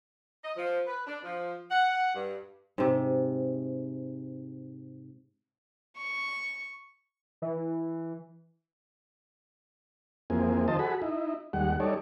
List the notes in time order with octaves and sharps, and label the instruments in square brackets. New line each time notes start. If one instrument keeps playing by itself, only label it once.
[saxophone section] D#5
F3
B4
D4
F3
F#5
G2
[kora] G#2 C3
[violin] C#6
[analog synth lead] E3
[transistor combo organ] F2 E3 A#3 C4 G#4
D#3 F3 C5 D#5 A5
F#4 G#4 A4 B5
D#4 E4
D#2 G3 G#3 F#5
G3 D#4 A4 C#5 D5